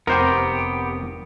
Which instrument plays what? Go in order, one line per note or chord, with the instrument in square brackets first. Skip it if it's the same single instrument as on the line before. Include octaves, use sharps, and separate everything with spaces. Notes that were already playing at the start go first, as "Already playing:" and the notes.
[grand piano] F1 [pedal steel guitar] B3 G4 [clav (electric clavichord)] A#4 C5 G5